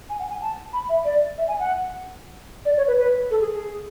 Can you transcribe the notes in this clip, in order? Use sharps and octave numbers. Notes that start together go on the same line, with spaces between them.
G#5
F#5
G#5
A5
B5
E5
D5
E5
G#5
F#5
D5
C#5
B4
B4
A4
G#4
G#4